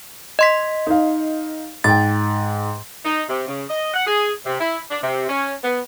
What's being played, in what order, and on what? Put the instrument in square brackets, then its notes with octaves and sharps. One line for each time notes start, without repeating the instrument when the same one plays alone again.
[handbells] D#5 C6 B6
[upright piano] D#4 F5
[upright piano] G#2 G5 [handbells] A6
[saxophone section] D#4
C3
C#3
D#5
F#5
G#4
C3
E4
D4
C3
C#4
B3